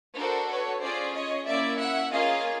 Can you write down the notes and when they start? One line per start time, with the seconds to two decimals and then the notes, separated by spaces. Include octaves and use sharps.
0.17 D4 F#4 A4 A#4 C5
0.50 B4 C#5
0.82 C#4 F4 G#4 C5 D5
1.15 C#5 D#5
1.47 A#3 C#4 E4 D5 E5
1.79 E5 F#5
2.11 A#3 C#4 F4 G#4 D#5 F5